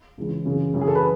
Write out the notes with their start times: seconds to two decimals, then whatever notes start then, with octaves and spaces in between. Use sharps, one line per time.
0.18 C#2 C#3 E3
0.45 F#2 C#3 E3
0.74 F#2 C#3 E3
0.81 G#4
0.88 A4
0.95 B4